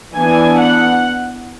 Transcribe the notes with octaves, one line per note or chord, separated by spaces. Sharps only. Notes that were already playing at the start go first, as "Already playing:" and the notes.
E3 B3 D4 G#5
F#5